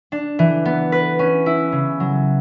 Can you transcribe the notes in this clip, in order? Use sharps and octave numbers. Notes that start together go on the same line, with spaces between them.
D4
E3
B3
B4
C#4
E4
C#3
F#3